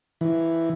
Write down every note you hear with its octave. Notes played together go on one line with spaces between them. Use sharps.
E3